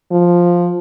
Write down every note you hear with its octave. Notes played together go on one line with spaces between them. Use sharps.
F3